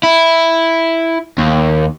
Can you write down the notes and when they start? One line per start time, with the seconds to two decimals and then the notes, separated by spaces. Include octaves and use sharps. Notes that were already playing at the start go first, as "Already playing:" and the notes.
0.03 E4
1.38 D#2